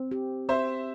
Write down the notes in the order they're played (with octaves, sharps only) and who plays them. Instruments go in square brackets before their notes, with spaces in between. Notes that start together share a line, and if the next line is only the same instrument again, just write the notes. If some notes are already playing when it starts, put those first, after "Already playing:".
Already playing: [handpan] C4
G4
[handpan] C4 [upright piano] C5 E5